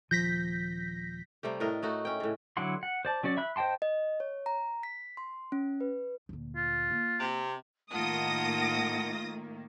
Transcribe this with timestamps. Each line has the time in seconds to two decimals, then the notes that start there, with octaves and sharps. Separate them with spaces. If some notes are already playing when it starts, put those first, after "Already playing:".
0.11 D#1 F3 G6 A#6 B6
1.43 C3 G3 A3 G4
1.60 A2 D4 A#4 D#5
1.82 A3 D#4 F#4
2.05 C#4 G5
2.20 A2 C#3
2.57 D3 F#3 E4 F#5 C6
2.83 F#5
3.05 C5 D5 A5
3.23 F#3 C#4 F#4 D5
3.37 E5 B5 F#6
3.56 C5 D#5 G5 A5 C6
3.82 D#5
4.20 C#5
4.46 A#5
4.83 B6
5.17 C6
5.52 C#4
5.81 B4
6.29 D2 A#2
6.56 F4
6.91 A#3
7.19 C3
7.92 A2 D#3 A#3 F4 F#5 A5 D#6 A#6